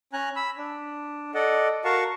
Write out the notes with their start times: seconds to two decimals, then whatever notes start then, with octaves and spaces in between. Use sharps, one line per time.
0.13 C#4 G#5 A#5 F#6
0.36 B5 E6
0.58 D4
1.34 A4 D5 D#5 F#5
1.85 F#4 A#4 F5 F#5 A5 C#6